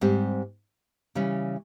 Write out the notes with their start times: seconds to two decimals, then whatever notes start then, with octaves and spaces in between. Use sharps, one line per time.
0.01 G#2 G3 C4 G4
1.15 C#3 E3 G3 C#4